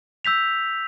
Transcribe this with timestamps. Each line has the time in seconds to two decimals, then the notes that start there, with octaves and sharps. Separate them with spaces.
0.25 E6 G6 B6 F7